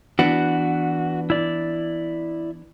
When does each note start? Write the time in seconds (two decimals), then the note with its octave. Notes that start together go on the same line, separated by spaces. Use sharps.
0.19 E3 B3 D4 F#4
1.30 E4 D5